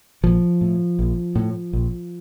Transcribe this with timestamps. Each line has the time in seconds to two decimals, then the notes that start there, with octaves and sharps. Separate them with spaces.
0.23 A#1 F3
0.61 A2
0.99 A#1
1.35 A2
1.73 A#1